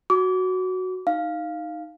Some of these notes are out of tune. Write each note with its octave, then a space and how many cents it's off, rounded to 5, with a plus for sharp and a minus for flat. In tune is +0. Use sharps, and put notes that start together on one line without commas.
F#4 +0 D6 -30
D#4 +0 F5 +0